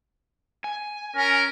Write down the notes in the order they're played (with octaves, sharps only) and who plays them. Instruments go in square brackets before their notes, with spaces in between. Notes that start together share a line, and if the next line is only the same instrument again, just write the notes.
[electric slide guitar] G#5
[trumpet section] C#4 A#4